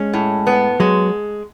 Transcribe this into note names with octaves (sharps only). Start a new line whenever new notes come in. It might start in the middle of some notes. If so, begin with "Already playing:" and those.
Already playing: G#3 C#4
A2
B3
F#3 G#3